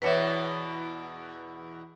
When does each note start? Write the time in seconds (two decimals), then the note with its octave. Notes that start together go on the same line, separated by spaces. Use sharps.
0.02 E2 B2 E3 B4 C#5 E5